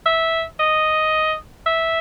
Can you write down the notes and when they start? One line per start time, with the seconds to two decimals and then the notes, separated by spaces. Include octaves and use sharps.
0.06 E5
0.59 D#5
1.66 E5